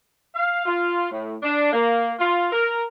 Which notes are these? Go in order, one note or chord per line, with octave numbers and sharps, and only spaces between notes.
F5
F4
A2
D4
A#3
F4
A#4